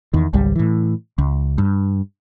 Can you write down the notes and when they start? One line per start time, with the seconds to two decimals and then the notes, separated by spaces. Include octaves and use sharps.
0.13 E2 D#3
0.33 G#1 C#2 G3
0.56 A2 E3
1.18 C#2
1.58 G2